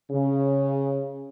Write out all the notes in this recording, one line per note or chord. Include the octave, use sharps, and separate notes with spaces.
C#3